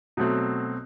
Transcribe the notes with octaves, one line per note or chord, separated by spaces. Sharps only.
B2 F#3 A3 C4